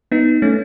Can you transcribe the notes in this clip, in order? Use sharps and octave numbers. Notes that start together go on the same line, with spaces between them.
B3 D#4
A3 C#4